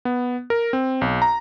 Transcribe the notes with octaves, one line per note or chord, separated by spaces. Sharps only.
B3
A#4
C4
B1
A#5